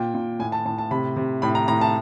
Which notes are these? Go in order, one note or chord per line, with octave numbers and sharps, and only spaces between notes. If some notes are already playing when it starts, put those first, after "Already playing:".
Already playing: A#2 G5
A#2
A2 G#5
A5
A2 A5
A5
C3 B5
C3
A2 B5
A#5
A2 A#5
A5